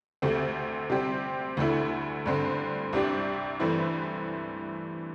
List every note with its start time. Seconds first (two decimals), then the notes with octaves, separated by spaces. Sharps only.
0.22 D2 C3 A3 C4
0.90 C3 G3 C4 G4
1.57 D2 D3 A3 E4
2.26 G2 D3 C4
2.93 C2 C3 G3 D4 G4
3.60 G2 E3 A3 C4 E4